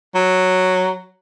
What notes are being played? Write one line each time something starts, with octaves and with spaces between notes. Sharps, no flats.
F#3